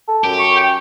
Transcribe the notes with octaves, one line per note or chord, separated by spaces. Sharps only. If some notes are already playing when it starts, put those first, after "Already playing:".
A4
F#2 G4
C#6
G5